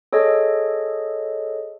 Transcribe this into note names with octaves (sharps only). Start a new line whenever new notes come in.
G#4 A4 C#5 D#5